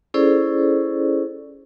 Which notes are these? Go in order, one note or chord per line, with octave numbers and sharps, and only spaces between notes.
C#4 E4 G#4 A4 C5 D5